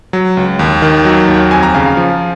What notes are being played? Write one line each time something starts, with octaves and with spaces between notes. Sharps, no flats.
F#3
C#2
D#2
D#3
F#3
D#2
F2 G#5
A#5
C#3 F5 G#5
F3